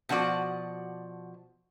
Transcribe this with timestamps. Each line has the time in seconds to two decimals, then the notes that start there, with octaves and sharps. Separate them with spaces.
0.09 B2 F3 F#4 D5